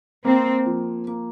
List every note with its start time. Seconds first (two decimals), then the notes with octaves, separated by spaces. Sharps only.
0.25 A#3 C4
0.66 F3
1.07 A#3